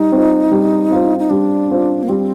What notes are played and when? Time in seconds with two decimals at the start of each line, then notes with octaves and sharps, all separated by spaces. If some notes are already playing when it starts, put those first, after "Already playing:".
Already playing: G3 D#4
0.12 C4 F4 C5
0.51 G3
0.90 C4 F4 C5
1.19 D#4
1.30 G3 D4
1.70 C4 F4 C5
2.03 A#3
2.09 G3 C4